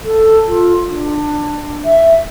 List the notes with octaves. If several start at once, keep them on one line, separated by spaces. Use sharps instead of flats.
A4
F4
D4
E5